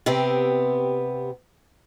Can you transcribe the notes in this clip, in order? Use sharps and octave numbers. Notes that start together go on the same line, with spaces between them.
C3 B3 C4 G4